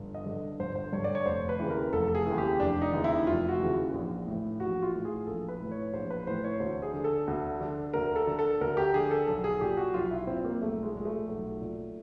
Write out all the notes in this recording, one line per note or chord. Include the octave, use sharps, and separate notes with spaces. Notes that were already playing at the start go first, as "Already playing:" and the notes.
Already playing: G1
D#5
G2 D3
G1 C5
C5
G2 D3 C#5
D5
C#5
F1 C5
B4
D#2 C#3 E3
A#4
F1 A4
A4
G#4
D#2 C#3 E3
G4
F1 D4
D#4
D#2 C#3 E3
E4
F1 F4
F#4
D#2 C#3 E3
A#1
A2 E3
A#1 F#4
F4
A2 E3
G#4
A#1 A4
B4
A2 E3
C#5
A#1 C5
B4
A2 E3 C5
C#5
D2 C5
G#4
D3
A4
D2
D3
D2 A#4
A4
D3
A4
D2 A#4
G4
D3 G#4
A4
B1 A4
G#4
A#2 G4
F#4
B1 F4
E4
A#2 C4
A#3
B1 A3
G#3
A#2 G#3
A3
B1
A#2